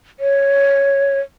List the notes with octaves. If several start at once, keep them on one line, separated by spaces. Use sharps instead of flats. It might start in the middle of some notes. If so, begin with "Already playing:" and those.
C#5